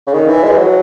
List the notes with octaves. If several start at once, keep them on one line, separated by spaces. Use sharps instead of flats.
C#3
D#3
E3
G#3
E3
F#3